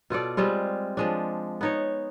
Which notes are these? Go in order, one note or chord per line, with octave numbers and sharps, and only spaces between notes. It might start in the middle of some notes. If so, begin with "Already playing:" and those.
B2 F4 A4 D5
G3 G#3 C4 F4
F3 G#3 D4
B3 D#4 C#5